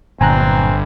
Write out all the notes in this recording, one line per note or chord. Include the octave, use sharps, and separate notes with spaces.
G1 A#2 D3 F#3 C4 G#5 A#5 F#6